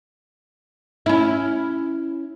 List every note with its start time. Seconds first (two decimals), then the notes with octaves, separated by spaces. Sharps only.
1.06 C#4 E4